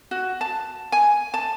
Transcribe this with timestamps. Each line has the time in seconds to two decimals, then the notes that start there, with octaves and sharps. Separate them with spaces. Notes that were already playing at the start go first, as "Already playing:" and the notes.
0.11 F#4
0.41 A5
0.92 G#5
1.34 A5